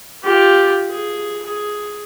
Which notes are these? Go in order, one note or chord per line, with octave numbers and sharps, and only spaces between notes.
F4 G4
G#4
G#4